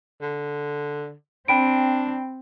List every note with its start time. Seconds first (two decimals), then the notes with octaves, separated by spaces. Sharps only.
0.21 D3
1.48 C4 D4 G5 B5 D7